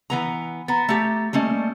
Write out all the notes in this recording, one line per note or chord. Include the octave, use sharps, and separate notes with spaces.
E3 B3 A#5
B3 A#5 A6
A3 G4
G3 A3 A#3 C#4 D#5